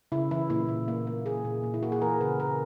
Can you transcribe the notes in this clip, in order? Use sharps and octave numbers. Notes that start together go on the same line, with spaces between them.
C#3 E4
E3 E4
A#2 E4
A#2
A#3
A#3
A#3 G#4
A#2
A#2
E4
A#3 F#4
G#4
E3 A#4
C#3 B4
C#3 A#4